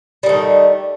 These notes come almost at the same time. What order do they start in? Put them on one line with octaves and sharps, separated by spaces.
G3 D#3 A3